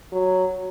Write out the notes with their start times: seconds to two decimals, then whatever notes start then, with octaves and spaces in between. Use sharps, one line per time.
0.12 F#3